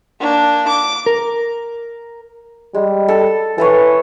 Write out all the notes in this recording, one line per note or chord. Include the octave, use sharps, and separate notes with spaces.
A#3 D4
D6
A#4
G3 G#3
A4
E3 A4 B4 C#5